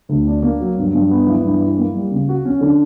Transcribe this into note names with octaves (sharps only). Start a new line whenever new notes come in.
D2
D4
A#3
F#3
G2
G2
B3
E3
G2
E4
A#3
G3
C#3
F#4
C#4
D3